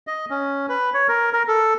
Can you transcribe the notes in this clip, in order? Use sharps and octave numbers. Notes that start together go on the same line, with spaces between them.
D#5
C#4
B4
C#5
A#4
A#4
A4